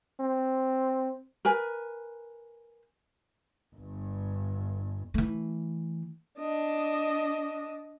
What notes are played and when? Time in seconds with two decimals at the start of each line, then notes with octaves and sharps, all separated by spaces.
0.20 C4
1.45 A#4 B4 G#5
3.76 G1 G2
5.14 E3 A3
6.39 D4 D#5